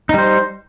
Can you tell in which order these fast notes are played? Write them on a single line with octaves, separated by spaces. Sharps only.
D#4 G3 C5